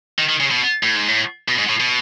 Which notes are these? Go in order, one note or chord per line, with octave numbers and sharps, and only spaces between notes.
D#3
D#3
C#3
B2
A2
G#2
A2
B2
G#2
A2
B2